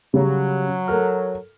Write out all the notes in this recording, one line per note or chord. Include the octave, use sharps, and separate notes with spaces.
C#3 F#3 G3 C#4
A4 A#4 F6